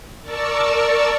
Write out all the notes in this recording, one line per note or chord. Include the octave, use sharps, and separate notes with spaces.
A#4 D5 A5 C#6 E6